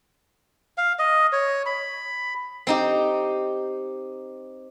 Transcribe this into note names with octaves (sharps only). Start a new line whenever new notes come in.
F5
D#5
C#5
B5
C4 D#4 G4